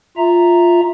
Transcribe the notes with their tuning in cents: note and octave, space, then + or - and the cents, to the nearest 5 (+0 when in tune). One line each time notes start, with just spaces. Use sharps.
F4 +0 E5 +0 A#5 +0